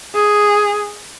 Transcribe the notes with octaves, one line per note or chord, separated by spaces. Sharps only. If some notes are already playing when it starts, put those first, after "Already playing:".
G#4